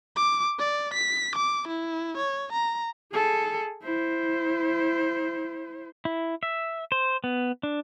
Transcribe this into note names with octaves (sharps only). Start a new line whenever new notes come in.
D6
D5
B6
D6
E4
C#5
A#5
G#4 A4
E4 C5
E4
E5
C5
B3
D4